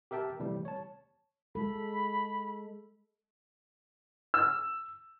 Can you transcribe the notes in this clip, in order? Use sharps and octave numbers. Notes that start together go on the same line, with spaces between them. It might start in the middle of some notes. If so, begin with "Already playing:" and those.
G4 A#4 E5 G5 A5
C3 E3 G3 A3
C#5 A5
G#3 A4 B5
E6